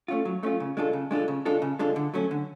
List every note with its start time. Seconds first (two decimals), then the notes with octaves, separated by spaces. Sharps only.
0.08 A3 C#4 F4
0.25 F#3
0.43 A3 C#4 F4
0.60 C#3
0.77 G#3 D4 F4 A4
0.93 C#3
1.11 G#3 D4 F4 A4
1.28 C#3
1.45 G#3 D4 F4 A4
1.62 C#3
1.79 G#3 D4 F4 A4
1.96 D3
2.14 F#3 A3 C#4
2.31 D3